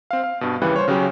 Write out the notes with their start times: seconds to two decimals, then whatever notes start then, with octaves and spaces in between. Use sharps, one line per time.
0.11 C4 F5
0.23 F5
0.41 G2 B2
0.62 D#2 C#3 E3 G3 B4 F#6
0.76 C5 C#5
0.88 C#3 F#3 C#4 G4